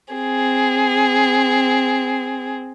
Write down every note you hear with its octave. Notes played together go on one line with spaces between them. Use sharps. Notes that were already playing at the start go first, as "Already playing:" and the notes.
C4 G#4